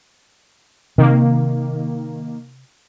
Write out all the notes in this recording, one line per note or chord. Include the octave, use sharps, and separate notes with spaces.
C3 D#3 A#3